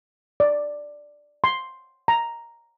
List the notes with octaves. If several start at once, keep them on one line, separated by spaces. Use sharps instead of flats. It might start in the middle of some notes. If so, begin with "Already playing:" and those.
D5
C6
A#5